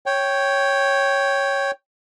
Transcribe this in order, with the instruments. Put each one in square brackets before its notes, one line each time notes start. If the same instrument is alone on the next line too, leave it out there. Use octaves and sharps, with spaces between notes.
[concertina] C#5 G5